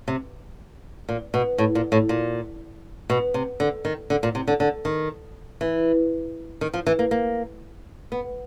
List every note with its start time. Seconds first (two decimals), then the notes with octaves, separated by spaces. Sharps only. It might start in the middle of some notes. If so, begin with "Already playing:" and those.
0.08 C3
1.09 A#2
1.34 B2
1.58 A2
1.75 A#2
1.92 A2
2.09 A#2
3.10 B2
3.34 C3
3.60 D3
3.85 D#3
4.10 D3
4.23 A#2
4.35 C3
4.47 D3
4.60 D3
4.85 D#3
5.61 E3
6.61 D#3
6.74 F3
6.86 E3
6.99 A#3
7.11 A#3
8.12 B3